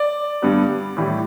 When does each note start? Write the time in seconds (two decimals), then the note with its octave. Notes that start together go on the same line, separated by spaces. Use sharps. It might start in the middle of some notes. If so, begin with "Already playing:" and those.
Already playing: D5
0.42 G2 D3 G3 B3
0.97 A2 E3 G3